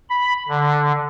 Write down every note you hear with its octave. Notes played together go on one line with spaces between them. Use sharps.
B5
D3